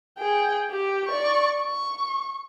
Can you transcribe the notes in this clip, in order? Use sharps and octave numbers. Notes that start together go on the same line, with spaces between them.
G#4 G5
G4
D5 C#6
C#6